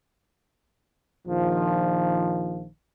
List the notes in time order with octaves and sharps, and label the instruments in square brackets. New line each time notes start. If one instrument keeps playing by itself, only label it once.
[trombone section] A#1 D#3 F3